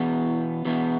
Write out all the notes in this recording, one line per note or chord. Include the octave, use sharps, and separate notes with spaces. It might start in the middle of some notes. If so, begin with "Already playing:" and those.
Already playing: E2 B2 B3
E2 B2 B3